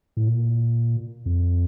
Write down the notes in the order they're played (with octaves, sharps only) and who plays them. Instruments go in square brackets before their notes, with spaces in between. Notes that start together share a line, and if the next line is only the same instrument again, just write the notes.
[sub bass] A2
A#2
F2